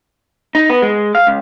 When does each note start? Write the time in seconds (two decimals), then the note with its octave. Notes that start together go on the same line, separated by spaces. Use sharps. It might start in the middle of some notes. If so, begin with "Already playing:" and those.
0.55 D#4
0.70 B3
0.82 G#3
1.15 F5
1.27 C#2